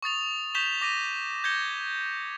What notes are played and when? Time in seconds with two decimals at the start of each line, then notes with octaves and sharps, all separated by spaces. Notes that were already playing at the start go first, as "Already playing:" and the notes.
0.03 C#6 D#6 A6 F7
0.55 C#6 G6 B6 E7 F7 G7
0.81 D6 A#6 B6 D#7
1.44 G6 G#6 A#6 C#7 G7